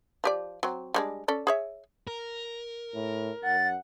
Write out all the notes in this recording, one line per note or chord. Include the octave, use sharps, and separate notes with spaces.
F3 G4 D5
F#3 C4
G3 G#3 D4
C#4 A4 D5
G#4 C#5 E5
A#4
A2
F#2 F#5 A6